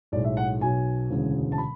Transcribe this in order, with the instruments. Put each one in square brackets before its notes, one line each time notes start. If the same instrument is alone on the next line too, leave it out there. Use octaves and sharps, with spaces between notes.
[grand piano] B1 A2 G#3 D5
E5
F#5
B1 B2 F#3 G#5
E1 D2 C#3 E3 G#3
A5
B5